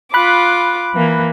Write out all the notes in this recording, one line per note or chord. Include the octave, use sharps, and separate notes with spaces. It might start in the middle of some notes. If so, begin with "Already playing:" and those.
F4 B5 D6 F#6
E3 A#3